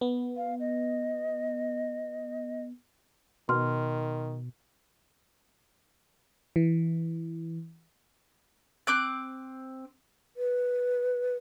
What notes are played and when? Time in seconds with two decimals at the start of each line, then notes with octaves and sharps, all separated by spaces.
0.01 B3
0.37 F5
0.60 D#5
3.49 B2 D#3 C6 F6
6.56 E3
8.87 C4 D6 F#6
10.37 B4